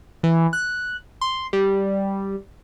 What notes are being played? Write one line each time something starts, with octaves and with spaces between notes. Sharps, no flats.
E3
F#6
C6
G3